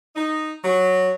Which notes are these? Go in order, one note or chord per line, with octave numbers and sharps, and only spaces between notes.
D#4
F#3